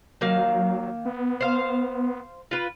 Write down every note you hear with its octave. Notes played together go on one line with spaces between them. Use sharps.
D#3 F#3 A#3 F5
B3
C5 F5
F4 B4